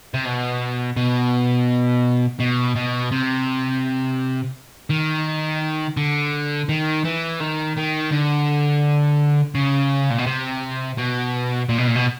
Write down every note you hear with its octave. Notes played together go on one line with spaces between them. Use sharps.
C3
B2
B2
B2
B2
C3
D#3
D3
D#3
E3
D#3
D#3
D3
C#3
A#2
B2
C3
B2
A#2
B2
A#2
B2